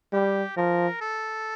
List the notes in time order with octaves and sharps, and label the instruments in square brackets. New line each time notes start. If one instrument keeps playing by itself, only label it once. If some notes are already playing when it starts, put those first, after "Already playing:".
[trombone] G3 [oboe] G4
[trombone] F3 [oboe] A#4
[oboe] A4